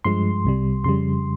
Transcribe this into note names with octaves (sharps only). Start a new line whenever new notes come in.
G2 F3 G#3 C6
C2 C3 G3
F2 C#3 G3 C6